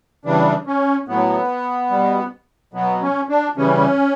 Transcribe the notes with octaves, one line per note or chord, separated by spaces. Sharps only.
C#3 E3 G3 D4
C#4
A2 F#3 B3
B2 G3
B2 F#3 B3
C#4
D4
C#3 E3 G3 C#4